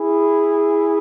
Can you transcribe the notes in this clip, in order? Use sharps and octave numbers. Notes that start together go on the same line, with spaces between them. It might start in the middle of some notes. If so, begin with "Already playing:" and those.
Already playing: E4 G#4